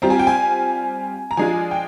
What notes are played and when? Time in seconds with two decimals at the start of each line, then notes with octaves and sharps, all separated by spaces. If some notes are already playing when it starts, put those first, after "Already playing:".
0.02 G3 C4 F4 A#5
0.10 G#5
0.19 G5
0.27 G#5
1.31 A#5
1.37 F3 G#3 D4 F4 G#5
1.71 G5